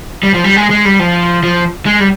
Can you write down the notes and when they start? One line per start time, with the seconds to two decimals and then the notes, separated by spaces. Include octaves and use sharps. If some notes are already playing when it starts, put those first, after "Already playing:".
0.23 G3
0.34 F3
0.44 G3
0.56 G#3
0.70 G#3
0.85 G3
0.99 F3
1.43 F3
1.86 G#3
2.00 G3